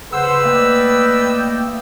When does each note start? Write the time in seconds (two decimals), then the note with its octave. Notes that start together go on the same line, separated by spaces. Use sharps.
0.13 C#3 B4 C5 F#5 E6
0.44 A3 A#3 D5 D#5 G5